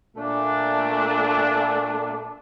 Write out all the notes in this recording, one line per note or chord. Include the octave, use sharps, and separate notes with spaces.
A#2 A3 D4